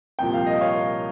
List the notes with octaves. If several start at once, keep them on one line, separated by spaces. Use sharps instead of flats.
C2 A#2 F3 G5
F5
D#5
C#5 F5